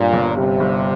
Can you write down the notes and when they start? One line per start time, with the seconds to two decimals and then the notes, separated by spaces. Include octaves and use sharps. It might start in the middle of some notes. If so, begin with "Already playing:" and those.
Already playing: G2 A#2
0.13 G1
0.36 C3 G3
0.60 G1